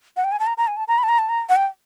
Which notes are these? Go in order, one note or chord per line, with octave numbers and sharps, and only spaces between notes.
F#5
G5
G#5
A5
A#5
A#5
G#5
A5
A#5
B5
A5
A#5
A5
A#5
F#5
G5